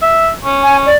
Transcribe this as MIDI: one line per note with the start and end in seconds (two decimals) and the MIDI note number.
0.02 0.31 76
0.45 0.91 61
0.63 0.77 80
0.86 0.97 74